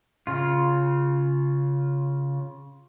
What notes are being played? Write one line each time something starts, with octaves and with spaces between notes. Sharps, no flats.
C#3 F4